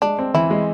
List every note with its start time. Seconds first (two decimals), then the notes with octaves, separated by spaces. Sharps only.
0.02 G#3 D4
0.19 C4
0.34 E3 E4
0.50 G#3